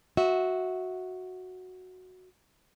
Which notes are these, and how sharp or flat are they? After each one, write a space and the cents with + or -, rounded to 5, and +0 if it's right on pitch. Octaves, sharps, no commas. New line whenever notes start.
F#4 -5 E5 -20